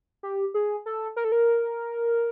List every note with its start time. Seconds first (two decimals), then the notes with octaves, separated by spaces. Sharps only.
0.23 G4
0.54 G#4
0.86 A4
1.16 A#4
1.25 A4
1.32 A#4